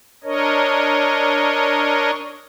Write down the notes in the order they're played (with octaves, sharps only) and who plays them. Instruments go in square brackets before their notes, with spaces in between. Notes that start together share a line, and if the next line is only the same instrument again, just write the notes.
[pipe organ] D4 A#4 C#5 D#5